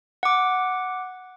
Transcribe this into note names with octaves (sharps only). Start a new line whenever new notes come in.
F#5 D6